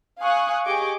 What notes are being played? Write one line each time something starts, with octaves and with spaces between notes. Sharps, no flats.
F5 G#5 C#6 D#6 F#6
G4 G#4 D#5 C#6 D6